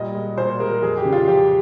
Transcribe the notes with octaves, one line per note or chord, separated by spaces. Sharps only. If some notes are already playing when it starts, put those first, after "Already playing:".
Already playing: A#2 G3 D#5
G#3
A#2 C5
G#3 A#4
F2 G#4
G4
C#3
F4
F2 G4